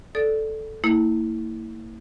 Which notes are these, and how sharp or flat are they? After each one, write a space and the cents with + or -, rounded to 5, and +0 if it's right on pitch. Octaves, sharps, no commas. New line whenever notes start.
A4 -5 D5 +0 D#6 +0
A#3 -40 E4 -25